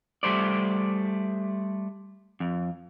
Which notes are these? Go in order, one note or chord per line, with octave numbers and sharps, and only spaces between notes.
G3 A3 C5 D5
F2